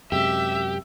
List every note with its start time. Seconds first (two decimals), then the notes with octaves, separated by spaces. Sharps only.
0.12 F#2 C3 G#3 G4 E5